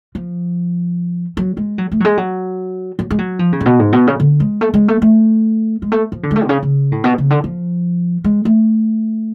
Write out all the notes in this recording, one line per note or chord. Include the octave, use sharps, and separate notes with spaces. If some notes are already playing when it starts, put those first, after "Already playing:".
F3
F#3
G#3
F#3
A3
F#3
G#3
F#3
F#3
G#3
F#3
F3
C#3
A2
B2
G#2
B2
C#3
D3
G#3
A3
G#3
A3
A3
G#3
A3
F3
D3
G#3
A3
B2
C#3
C#3
A2
B2
C#3
D3
F3
G#3
A3